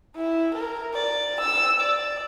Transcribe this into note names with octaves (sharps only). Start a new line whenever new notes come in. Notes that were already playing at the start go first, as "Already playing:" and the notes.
E4
A#4
D5
E6
D5